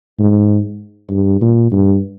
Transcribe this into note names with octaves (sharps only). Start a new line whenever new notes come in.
G#2
G2
A#2
G2